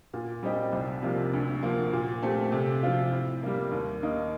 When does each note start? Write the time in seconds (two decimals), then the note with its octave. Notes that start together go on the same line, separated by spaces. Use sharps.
0.14 A#2
0.43 G3 C4 D#4 G4
0.72 C2
1.02 C3 F3 A#3
1.33 D2
1.63 D3 F3 A#3
1.93 A#2
2.23 A3 C4 G4
2.52 C3
2.83 F3 C4 F4
3.12 A2
3.43 G3 A#3
3.72 D#2
4.03 D#3 A#3 D#4